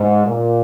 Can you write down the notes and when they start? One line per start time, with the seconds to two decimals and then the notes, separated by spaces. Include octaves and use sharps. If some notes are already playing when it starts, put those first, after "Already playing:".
Already playing: G#2
0.26 A#2